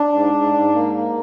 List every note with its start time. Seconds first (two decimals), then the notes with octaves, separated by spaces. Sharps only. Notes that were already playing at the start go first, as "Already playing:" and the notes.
Already playing: D4
0.13 G#2
0.34 G#2
0.54 G#2
0.75 A#3
0.95 A#3